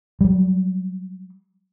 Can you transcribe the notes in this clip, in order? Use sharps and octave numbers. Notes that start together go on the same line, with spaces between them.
F#3 G3